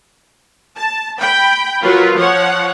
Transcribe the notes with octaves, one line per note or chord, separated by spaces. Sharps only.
A5
G5 B5
F#3 F4 A#4 B4
F3 C#5 F#5